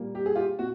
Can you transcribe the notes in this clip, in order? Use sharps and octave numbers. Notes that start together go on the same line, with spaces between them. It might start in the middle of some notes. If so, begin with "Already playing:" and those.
Already playing: A#2 G3 A#3
G4
G#4
F4 G4
A#2 F#4